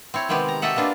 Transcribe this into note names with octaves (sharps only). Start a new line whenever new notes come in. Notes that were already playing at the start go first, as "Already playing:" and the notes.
C4 E4 C#5
C3 D#3 G#3 B3 C4 G4
A#5
F#4 G4 A4 D#5 E5 F#5
A#3 B3 D4 F4 F#4